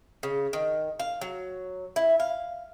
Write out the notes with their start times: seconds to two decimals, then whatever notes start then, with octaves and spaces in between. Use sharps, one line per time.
0.23 C#3
0.53 D#3
0.99 F5
1.21 F#3
1.96 E4
2.20 F5